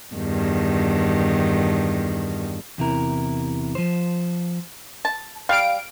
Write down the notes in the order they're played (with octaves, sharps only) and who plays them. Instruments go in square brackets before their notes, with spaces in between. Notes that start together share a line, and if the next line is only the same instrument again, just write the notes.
[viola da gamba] E2 G2 D#3
[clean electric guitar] E2 C3 E4 A#4
F3 C5
[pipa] A5
[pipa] G3 [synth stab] F5 D7